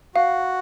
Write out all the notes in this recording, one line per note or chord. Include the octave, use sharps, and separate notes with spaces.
F#4 F5